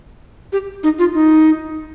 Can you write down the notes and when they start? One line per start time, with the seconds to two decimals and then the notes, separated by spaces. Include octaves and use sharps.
0.53 G4
0.83 D#4
0.99 F4
1.14 D#4